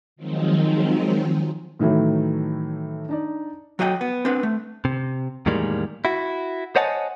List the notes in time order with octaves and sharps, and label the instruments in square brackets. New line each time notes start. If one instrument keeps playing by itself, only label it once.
[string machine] D#3 F3 F#3 G#3 C4 D#4
[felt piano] A2 D#3 E3 F#3 A3
D4 D#4 D5
[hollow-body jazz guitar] F#3 F#4 D#5 F5 G5
B3
C4 D4 B4
A3
[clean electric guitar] C3
E2 A2 D#3 G3 G#3 A#3
E4 F#4
C5 C#5 D#5 F#5 G#5 A5